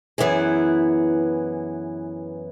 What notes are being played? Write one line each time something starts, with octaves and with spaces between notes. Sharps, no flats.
F#2 E3 B3 E4 G#4